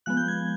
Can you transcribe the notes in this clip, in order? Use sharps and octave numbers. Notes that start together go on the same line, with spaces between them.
F3 G#3 B3 F#6
G6
G#6